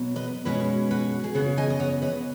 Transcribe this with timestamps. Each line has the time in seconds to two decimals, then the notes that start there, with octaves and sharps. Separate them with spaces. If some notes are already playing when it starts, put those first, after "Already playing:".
Already playing: B2 F#3 B3
0.16 B4 D#5
0.45 B2 G#3 C#4 F#4 B4
0.91 F#4 B4
1.24 G#4
1.35 C#3 B3 F#4 B4
1.57 D#5 G#5
1.70 D#5
1.80 C#5 F#5
2.02 B4 D#5